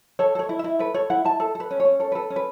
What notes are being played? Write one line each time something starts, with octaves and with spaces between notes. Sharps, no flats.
A4 C#5
A4 C#5
E4
E4 E5
A4 B4
A4 C#5
E4 F#5
E4 A5
A4 A5
A4 B4
C#4
C#5
C#4
A4 C#5
A4 B4
C#4
B4